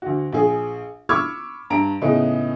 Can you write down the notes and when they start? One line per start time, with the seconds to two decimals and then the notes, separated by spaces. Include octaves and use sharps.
0.02 D2 F#4
0.33 A#1 G#4
1.09 B5 C#6 D6 E6 F6 G#6
1.70 G2 A#5 D7
2.01 A2 C#3 G#3 B3 D#4